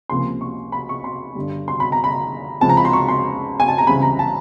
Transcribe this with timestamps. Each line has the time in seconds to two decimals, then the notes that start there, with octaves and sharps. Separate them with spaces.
0.10 C#2 C3 F3 A#3 C6
0.41 C#6
0.72 B5
0.89 C#6
1.04 C6
1.35 G1 G2 D3 G3
1.68 C6
1.80 B5
1.92 A#5
2.04 B5
2.61 C#2 C#3 F3 G#3 C4 A5
2.69 A#5
2.77 B5
2.85 C6
2.93 C#6
3.08 C6
3.60 G#5
3.68 A5
3.78 A#5
3.87 C#2 C#3 E3 G3 C4 B5
4.02 A#5
4.19 A5